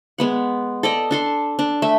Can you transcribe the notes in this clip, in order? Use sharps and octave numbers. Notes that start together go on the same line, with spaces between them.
G#3 B3 F#5
A4 D5 D#5
D4 A4 C6
D4
A3 E5